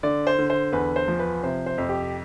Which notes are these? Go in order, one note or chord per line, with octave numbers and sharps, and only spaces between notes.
D3 D5
C5
D3
C5
E2 B4
C5
F3
B4
C3 C5
C5
F2
G4